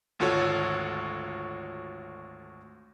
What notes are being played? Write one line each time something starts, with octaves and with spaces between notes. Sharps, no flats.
G#1 D2 F4 F#4 A4 C#5